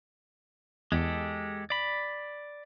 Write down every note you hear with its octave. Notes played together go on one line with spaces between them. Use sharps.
E2 G#3 G4 A4
D5 B5